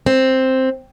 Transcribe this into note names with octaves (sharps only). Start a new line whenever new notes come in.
C4